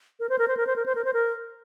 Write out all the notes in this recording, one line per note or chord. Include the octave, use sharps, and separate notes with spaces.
A#4
C5
A#4
C5
A#4
C5
A#4
C5
A#4
C5
A#4